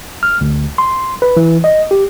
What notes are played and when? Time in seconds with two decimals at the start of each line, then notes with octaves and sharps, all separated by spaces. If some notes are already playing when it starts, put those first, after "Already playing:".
0.23 F6
0.41 D2
0.78 C6
1.22 B4
1.37 E3
1.64 D#5
1.91 G4